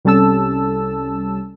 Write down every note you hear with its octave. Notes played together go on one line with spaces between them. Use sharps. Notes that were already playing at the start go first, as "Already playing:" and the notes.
C2 G3 C#4 A4 A5 E6